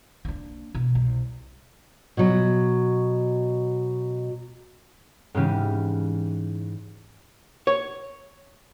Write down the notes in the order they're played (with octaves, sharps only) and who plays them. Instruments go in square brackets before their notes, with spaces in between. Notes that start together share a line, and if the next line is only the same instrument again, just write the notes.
[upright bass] A#3 D4
B2
C2
[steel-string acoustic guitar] B2 F#3
[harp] G#2 C#3 E3 G#3 C#4 G4
[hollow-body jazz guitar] C#5